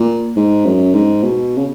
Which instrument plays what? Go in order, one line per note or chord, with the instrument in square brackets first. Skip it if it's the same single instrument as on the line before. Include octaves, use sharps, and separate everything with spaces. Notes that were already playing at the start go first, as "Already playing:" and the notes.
Already playing: [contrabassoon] A#2
G#2
F#2
G#2
B2
C#3